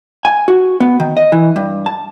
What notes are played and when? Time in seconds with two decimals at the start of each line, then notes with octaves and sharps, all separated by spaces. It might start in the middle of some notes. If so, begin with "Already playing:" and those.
0.25 G#5
0.48 F#4
0.80 B3
1.00 D#3
1.17 D#5
1.32 E3
1.56 G2
1.86 A5